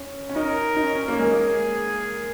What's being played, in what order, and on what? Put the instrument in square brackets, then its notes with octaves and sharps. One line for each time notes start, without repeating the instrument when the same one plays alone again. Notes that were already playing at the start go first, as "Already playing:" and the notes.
Already playing: [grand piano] C#4
C#4
[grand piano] D#4 [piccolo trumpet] A#4
[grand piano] D#4
C#4
C#4
A#3
G#3
[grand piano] A#3 [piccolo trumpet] G#4